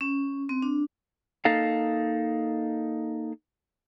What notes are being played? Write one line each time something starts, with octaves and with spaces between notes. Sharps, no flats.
C#4
C4
D4
A#3 D#4 A4 F5